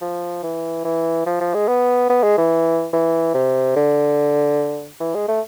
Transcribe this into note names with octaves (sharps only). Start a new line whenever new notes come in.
F3
E3
E3
F3
F3
G#3
B3
B3
G#3
E3
E3
C3
D3
E3
G#3
A3